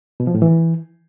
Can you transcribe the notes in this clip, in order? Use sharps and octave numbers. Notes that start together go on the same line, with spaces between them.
B2
F3
A2
E3